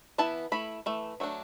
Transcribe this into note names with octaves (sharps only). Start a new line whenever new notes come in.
E3 B3 E4 A5
A3 E4 B5
E3 A3
F#3 A3 D4